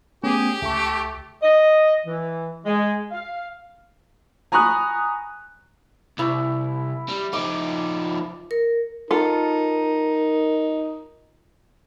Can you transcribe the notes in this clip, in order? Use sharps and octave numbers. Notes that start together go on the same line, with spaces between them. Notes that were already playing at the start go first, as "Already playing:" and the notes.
A3 B3 C#4 G4 G#4
C#2 A3 C#6
D#5
E3
G#3
F5
G#5 A#5 B5 C#6 D#6 F#6
C2 E4
G3
F3 D#4 D6
A#4
D#4 F4 A4 A#4